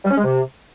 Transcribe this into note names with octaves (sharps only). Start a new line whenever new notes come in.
G3
C#4
G#3
C3